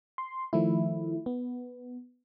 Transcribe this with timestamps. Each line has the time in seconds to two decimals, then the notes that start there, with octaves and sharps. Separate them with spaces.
0.18 C6
0.53 D#3 F3 A3 E4
1.26 B3